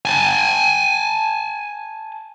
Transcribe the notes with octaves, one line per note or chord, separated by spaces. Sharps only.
G#5 A5